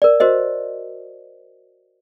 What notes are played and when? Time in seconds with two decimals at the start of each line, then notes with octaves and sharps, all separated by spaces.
0.02 A#4 D5
0.20 F#4 A#4 C5 D#5